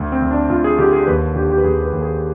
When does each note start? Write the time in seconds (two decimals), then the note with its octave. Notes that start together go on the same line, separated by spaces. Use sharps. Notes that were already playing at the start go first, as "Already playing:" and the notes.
Already playing: D2
0.12 C4
0.22 D2
0.31 D4
0.50 D2 F4
0.64 G#4
0.78 D3 G4
0.93 G#4
1.07 D#2 B4
1.36 D3 G4
1.50 G4
1.58 B4
1.64 D#2 G#4
1.83 B4
1.93 D#2
2.02 G#4